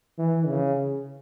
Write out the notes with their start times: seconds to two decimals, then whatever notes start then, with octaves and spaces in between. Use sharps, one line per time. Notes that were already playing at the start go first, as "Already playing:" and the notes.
0.18 E3
0.47 C#3